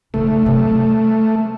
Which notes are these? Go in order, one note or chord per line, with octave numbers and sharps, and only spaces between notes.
C#3 A3 D#4
C3 F#3
G3